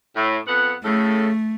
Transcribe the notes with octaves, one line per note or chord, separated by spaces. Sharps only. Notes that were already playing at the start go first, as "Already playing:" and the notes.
A2
F2 B3 F#5
A2 C#3 A3 A4